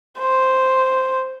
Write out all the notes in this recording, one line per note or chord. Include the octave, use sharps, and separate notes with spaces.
C5